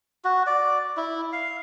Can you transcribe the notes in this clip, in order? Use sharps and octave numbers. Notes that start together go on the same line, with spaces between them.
F#4
D5
E4
F5